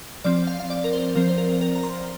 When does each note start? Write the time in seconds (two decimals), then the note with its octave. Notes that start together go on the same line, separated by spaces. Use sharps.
0.24 F3 C4 D5
0.47 F5
0.60 F5
0.70 D5
0.84 A#4
0.93 C5
1.15 F3 C4 A#4
1.29 C5
1.38 A#4
1.61 A#4
1.75 A#5
1.83 C6